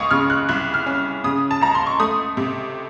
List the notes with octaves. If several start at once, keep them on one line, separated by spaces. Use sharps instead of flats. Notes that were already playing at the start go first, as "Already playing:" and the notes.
Already playing: C#2 C#6 D#6
C#3 F6
F#6
C2 F#6
F6
C#4
C#3 D#6
A5
C#2 A#5
C6
C#6
A3 D#6
C3